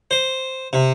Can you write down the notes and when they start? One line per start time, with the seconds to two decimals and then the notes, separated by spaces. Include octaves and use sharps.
0.11 C5
0.73 C3